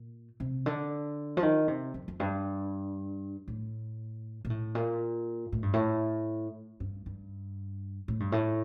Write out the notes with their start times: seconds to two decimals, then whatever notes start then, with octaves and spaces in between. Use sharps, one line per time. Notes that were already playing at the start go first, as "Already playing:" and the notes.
Already playing: A#2
0.40 C3
0.66 D3
1.37 F3
1.43 D#3
1.68 C3
1.94 F2
2.08 F2
2.20 G2
3.48 A2
4.45 A#2
4.50 A2
4.75 A#2
5.52 A2
5.63 G2
5.73 A2
6.80 G2
7.06 G2
8.08 A2
8.20 G2
8.32 A2